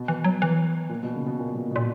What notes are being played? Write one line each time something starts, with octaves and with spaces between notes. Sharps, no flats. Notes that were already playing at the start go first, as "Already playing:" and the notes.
Already playing: B2
E3
F#3
E3
A#2
B2
C#3
B2
A#2
B2
B2
A#2